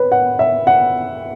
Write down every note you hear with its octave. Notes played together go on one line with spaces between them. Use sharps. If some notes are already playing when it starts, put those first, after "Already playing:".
Already playing: B4 C#5
F#5
E5
F#5